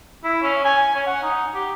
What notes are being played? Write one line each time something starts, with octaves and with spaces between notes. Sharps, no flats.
E4
C#4
G#5
C#4
F#5
D#4
G4